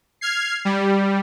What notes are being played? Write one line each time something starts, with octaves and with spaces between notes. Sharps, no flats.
F6 G#6 C7
G3